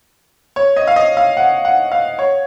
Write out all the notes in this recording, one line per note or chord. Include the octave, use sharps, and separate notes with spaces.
C#5
D#5
F5
D#5
F5
F#5
F#5
F5
C#5